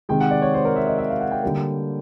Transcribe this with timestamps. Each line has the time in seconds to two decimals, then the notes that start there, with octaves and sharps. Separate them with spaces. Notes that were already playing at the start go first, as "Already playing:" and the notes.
0.09 C3 D#3 G#3 G5
0.21 F#5
0.31 D5
0.42 C#5
0.54 C5
0.65 A#4
0.76 E5
0.87 D#5
0.98 E5
1.10 F5
1.21 F#5
1.31 G5
1.43 D3 G3 A#3